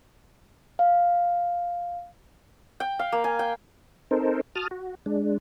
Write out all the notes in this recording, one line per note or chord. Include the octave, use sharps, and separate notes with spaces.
F5
G5
F5
A#3
G#5
G5
C4 D#4 A4 A#4 C5
F#4 A5 D#6 F6
F#4
G#3 D4